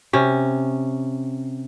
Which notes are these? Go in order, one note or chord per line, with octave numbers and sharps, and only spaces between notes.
C3 C#4